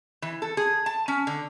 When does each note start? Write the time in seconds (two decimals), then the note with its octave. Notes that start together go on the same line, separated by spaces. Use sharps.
0.22 E3
0.42 A4
0.57 G#4
0.86 A5
1.08 C#4
1.27 D3